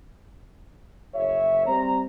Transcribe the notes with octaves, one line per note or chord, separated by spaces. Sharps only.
F#1 C#5 E5
G3 C4 C5 A#5